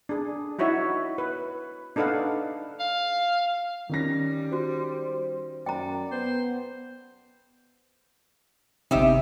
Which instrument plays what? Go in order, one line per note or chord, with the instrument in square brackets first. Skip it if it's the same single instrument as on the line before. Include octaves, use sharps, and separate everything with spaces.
[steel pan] D4 G#4
D#4 E4 F#4 C#5 E5
B4
D4 D#4 A4 B4 F5 F#5
[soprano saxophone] F5
[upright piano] D#3 C#4 A#6 [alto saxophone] G3
[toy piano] F#4 [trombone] C5
[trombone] F#2 [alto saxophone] D5 [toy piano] G5 A#5
[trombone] B3 [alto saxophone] C5
[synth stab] G1 C3 [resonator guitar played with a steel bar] D#4 G4 E5